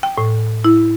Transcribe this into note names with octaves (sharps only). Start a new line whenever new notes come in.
G5
A2
E4